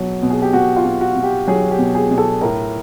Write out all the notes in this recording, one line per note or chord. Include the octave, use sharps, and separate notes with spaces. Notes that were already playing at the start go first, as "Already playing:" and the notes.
Already playing: B2 F#3
B2
G#4
G4
B2 F#4
F4
B2
F#4
B2
G4
F#3 G#4
G4
B2
G#4
B2
A4
A2 A#4